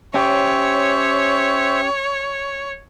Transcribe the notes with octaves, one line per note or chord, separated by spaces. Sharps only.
C#4 G4 C5 C#5 E5